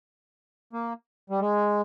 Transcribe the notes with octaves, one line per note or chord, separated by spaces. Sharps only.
A#3
G3
G#3